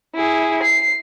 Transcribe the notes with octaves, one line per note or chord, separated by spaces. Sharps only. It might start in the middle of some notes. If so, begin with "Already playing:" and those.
E4 G#4
C7